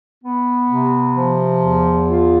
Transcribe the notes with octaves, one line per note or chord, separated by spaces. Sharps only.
B3
C3
F3
E2
F4